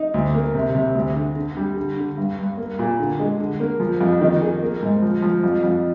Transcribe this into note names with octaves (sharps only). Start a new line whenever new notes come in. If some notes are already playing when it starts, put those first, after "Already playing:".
Already playing: D#4
D2
A#3
C3
C3
D2
D3
D3
G3
D3
D3
G2
G2
A#3
A#2
D3
G#3
D3
A#3
F3
F2
D#3
G#4
A#3
G#2
F3
F3
F2
F2